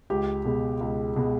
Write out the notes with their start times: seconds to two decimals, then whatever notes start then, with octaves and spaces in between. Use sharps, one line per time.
0.10 C#2 G4
0.45 B2 G#3
0.81 C#2
1.16 B2 G#3